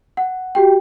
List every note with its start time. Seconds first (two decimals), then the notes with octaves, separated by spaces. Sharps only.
0.17 F#5
0.55 F#4 G4 G5